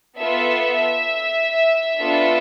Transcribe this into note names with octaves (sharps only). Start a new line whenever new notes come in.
B3 F4 A4 E5
B3 D4 F4 A4